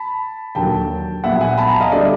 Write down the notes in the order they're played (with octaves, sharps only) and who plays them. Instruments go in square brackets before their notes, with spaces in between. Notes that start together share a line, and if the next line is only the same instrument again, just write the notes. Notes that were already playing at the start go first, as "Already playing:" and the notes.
Already playing: [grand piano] A5 B5
D#2 D3 F#3 A#3 G5 A5
A#1 A#2 F#3 B3 E5 F#5
F#5 G#5
A5 B5
G#5 A#5
D#5 F5
D3 G3 B3 D5 E5